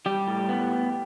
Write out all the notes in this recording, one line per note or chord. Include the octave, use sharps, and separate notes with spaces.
G3 G4
A2
B3